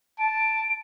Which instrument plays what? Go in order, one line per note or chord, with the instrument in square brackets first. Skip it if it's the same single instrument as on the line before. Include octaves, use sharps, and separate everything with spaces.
[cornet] A5 [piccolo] D7